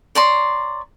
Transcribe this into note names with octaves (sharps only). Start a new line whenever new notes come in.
C#5 D5 A#5 C6